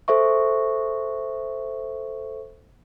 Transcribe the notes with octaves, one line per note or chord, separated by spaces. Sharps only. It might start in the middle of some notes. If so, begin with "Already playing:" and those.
A4 C5 E5 C#6